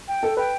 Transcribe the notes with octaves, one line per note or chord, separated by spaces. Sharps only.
G5
A4
B4 G5